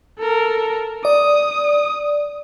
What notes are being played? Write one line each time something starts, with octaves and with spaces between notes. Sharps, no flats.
A4 A#4
D5 D#6